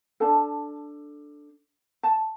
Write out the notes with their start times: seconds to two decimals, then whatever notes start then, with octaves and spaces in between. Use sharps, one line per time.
0.20 D4 A4 A5
2.03 A5